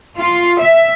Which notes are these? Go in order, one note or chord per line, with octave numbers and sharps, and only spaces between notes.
F4
E5